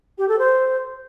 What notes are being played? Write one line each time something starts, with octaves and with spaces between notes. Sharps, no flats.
G4
A4
C5